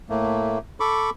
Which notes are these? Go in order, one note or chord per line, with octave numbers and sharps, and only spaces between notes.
A2 A3 A#3
A4 B5 C#6 D6